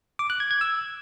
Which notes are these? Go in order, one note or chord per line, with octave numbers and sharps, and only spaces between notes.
D6
F#6
G#6
G#6
E6